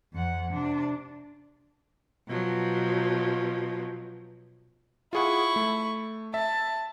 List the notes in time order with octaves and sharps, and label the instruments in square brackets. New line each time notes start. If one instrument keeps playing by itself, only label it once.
[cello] F2 F#5
C3 D4
[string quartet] B2 F3 F#3
[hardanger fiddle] E4 C#6 [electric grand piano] F4 G#4 F#5
[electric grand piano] A3
[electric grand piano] E5 [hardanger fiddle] A5